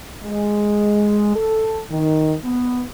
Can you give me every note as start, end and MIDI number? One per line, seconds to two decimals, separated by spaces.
0.24 1.34 56
1.36 1.81 69
1.90 2.35 51
2.44 2.82 59